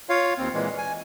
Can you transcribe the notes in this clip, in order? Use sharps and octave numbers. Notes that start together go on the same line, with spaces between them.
F4 C#5 F5
D#2 C4
A#2 E3 G#3
G#5